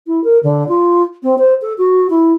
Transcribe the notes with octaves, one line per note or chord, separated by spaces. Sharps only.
E4
A#4
D3
F4
C4
C5
A4
F#4
E4